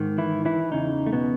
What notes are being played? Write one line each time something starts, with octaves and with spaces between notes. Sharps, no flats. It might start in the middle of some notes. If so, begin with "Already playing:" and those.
Already playing: G#2 D#3
E3 E4
E3 E4
E2 C#3 D#4
A3
B2 B3